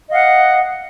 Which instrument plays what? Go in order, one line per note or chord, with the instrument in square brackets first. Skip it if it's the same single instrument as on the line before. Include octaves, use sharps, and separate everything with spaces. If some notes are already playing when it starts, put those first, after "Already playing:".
[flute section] D#5 F5 F#5